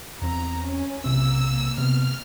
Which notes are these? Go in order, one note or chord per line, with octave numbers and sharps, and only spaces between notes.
E2 C4 A#5
C#4
B1 C3 A#3 C4 E6
C3 B3 F6